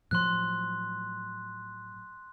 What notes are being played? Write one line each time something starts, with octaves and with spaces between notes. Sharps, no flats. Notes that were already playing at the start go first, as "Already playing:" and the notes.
A2 F3 F#3 C6 F#6